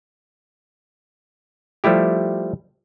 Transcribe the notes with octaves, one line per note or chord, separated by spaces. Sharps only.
F3 G3 A3 E4 G4